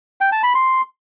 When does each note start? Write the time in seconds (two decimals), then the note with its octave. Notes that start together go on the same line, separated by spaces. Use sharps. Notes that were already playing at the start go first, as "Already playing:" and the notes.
0.21 G5
0.32 A5
0.43 B5
0.55 C6